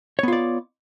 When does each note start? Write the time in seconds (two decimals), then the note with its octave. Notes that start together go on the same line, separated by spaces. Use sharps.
0.19 C#5
0.23 B3
0.28 F4
0.33 D5